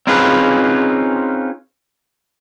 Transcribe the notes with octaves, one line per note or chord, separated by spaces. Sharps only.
C4 C#4 D#4 F4 G#4 B4